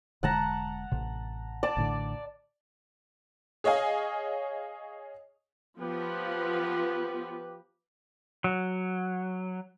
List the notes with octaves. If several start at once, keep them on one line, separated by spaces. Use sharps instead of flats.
E1 D3 G#3 F#5 A5 A#5
A1 C3
D5 A5 D6
A1 A2 D3
G#4 C#5 D#5 F5 G#5
F3 B3 G4 B4
F#3